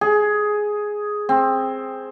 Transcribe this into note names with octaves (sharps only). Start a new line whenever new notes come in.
G#4
C4